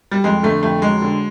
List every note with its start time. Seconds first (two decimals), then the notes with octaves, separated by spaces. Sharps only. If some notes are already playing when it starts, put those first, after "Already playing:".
0.11 G3
0.24 F2 G#3
0.43 D3 A3
0.63 F2 A3
0.82 F#3 G#3
1.02 D3